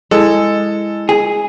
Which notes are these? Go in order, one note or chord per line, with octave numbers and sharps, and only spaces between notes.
G#3 E4 A4 A5
G#4